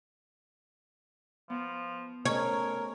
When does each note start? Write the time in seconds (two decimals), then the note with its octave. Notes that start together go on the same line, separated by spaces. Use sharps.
1.50 F3 B3
2.25 A3 C#4 G#4 A#4 C#5